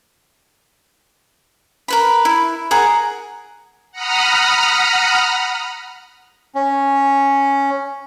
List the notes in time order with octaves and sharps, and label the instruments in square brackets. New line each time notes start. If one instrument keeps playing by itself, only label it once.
[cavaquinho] A#4 B4 B5
E4
G#4 A#4 F#5 A#5
[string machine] F#5 A#5 B5 D#6 F6
[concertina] C#4